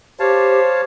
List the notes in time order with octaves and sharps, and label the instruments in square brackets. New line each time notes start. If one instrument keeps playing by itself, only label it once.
[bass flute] G4 [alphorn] C5 [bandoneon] C#5 F5 A5